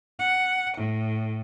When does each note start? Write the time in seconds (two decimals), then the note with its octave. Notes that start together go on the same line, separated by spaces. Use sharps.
0.20 F#5
0.77 A2